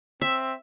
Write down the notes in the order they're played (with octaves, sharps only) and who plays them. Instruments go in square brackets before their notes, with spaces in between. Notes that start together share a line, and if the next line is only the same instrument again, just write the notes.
[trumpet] C4 [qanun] E5